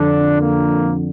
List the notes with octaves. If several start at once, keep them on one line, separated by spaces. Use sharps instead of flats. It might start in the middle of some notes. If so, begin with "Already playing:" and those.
Already playing: F2 D3 D4
A#3